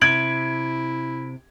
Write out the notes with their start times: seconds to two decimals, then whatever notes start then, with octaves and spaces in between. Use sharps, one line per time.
0.02 C3 E4 G#6 D7 F#7